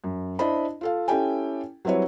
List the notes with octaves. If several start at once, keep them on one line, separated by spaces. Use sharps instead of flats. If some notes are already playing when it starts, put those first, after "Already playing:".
F#2
D4 E4 C5 D#5 B5
F4 A4 F5
C#4 E4 G4 A4 G5 G#5
F#3 G3 C4 E4 B4 C#5